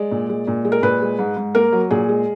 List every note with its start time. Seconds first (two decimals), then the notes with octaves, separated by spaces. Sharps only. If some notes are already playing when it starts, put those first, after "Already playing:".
Already playing: G#3 D5
0.11 A#2
0.29 G#3
0.47 A#2
0.65 G#3
0.72 A#4
0.82 A#2 B4
1.01 G#3
1.19 G#2
1.37 G#2
1.55 A#3 A#4
1.73 F#3
1.90 A#2 G#4
2.09 G#3